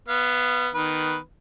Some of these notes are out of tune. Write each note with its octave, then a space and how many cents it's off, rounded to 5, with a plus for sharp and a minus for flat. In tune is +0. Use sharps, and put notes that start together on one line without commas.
B3 +0 F5 -35
D#3 +0 B3 -5 B4 +0